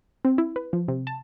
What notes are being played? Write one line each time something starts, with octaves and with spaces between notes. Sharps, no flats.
C4
E4
B4
F3
C3
A5